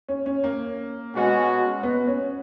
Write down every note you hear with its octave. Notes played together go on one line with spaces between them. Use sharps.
C#4
C#4
A#3
B2 G#3 C#4 F#4
B3
C#4